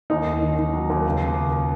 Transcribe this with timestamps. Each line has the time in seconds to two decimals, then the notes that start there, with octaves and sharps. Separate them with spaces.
0.10 D#2 D#4
0.26 D#2
0.42 D#3
0.58 D#3
0.73 F#3
0.90 D#2
1.05 C#2
1.21 C#3
1.36 C#2